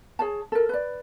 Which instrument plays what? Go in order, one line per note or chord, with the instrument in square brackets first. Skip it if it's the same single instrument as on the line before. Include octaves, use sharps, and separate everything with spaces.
[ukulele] G#4 C#5 A5
A4 A#4
B4 D5